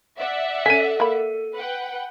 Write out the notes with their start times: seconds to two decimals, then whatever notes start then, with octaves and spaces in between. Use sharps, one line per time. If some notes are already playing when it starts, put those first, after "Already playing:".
0.19 D5 E5 F#5
0.66 C#4 A4 G5 G#5 B6 D#7
1.00 A#3 B5
1.55 B4 F#5 G5